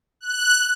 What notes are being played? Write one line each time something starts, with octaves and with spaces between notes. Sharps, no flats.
F#6